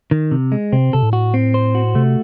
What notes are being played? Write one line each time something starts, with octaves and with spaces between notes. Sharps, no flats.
D#3
C3
G#3
C3 C4
C3 A4
A2
F#4
C4
C5
F#4
C3 A3